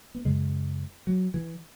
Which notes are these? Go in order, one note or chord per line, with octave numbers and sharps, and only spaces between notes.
B3
F#2 C#3 G#3
F#3
E3